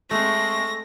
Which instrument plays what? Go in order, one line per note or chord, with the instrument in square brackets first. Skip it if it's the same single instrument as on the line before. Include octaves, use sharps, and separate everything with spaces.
[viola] G#3 C4 [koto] A3 [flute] C#6 [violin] A#6